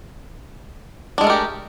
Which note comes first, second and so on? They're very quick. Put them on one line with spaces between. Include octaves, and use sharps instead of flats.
D4 G#3 A3 A#4 G4